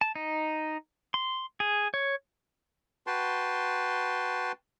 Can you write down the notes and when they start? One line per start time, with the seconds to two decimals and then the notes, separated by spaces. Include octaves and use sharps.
0.01 A5
0.16 D#4
1.14 C6
1.60 G#4
1.94 C#5
3.07 F#4 B4 G5 A5 C6